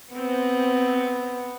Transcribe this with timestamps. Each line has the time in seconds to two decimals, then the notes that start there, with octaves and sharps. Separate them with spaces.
0.13 B3 C4